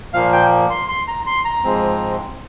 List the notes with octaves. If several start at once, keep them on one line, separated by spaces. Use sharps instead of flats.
A#2 F3 A#3 F5
G5
C6
C6
A#5
C6
A#5
G#2 F3 G#3 C4